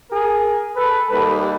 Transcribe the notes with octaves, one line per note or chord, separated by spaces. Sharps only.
G#4 A#4
A4 B4
D#2 D#3 G3 A4 B4